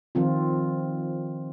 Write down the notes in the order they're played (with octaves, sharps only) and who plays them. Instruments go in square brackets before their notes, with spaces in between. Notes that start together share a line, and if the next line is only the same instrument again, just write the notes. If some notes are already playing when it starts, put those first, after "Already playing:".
[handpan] D#3 F3 C4 F4